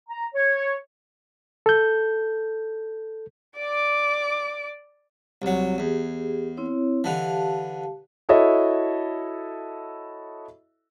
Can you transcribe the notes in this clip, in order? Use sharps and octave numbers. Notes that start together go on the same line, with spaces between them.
A#5
C#5
A4 G6
D5 D6
C2 F#3
E2 G4 G#4
C4 E4 C#5
D3 E3 G4 F5 A5
E4 F#4 A4 C#5 D#5 E5